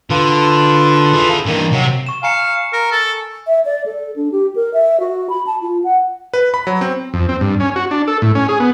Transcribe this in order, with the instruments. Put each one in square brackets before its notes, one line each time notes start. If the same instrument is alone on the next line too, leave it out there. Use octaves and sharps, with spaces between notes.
[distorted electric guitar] D3 [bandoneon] F4 A4 B4
[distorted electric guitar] E4 G#4
[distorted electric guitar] G2 E3 [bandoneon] D#3 A#3
[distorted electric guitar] C3 [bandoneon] F#3
[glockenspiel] C#6 E7
[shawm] F5 [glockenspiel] G#5 A#5 C#7
[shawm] A#4
A4
[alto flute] E5
D5
A4
D4
G4
A#4
E5
F#4
B5
A5
F4
F#5
[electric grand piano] B4
B5
F#3
C4
[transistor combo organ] F2
C4
G2
C#4
F#4
D4
A4
A2
C#4
G#4
B3